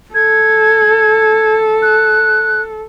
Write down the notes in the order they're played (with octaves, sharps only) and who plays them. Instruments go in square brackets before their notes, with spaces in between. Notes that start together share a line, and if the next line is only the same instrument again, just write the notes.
[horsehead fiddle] A4 [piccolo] G#6
[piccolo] F#6